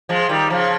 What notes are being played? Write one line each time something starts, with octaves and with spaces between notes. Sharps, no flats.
F3 G#3
D#3 G3
C#3 F3